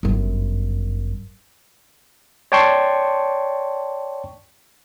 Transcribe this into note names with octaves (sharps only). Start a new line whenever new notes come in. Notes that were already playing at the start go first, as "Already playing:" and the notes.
G1 F#2
C#5 D5 G5 A5 C6 C#6